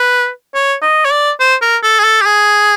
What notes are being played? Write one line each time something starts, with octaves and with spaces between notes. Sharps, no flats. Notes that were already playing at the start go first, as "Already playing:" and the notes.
Already playing: B4
C#5
D#5
C#5
D5
C5
A#4
A4
G#4
A4
G4
G#4